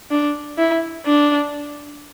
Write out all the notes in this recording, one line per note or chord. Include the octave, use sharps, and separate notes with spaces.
D4
E4
D4